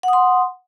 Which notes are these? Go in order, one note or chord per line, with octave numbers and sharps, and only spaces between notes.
F#5 C6 D#6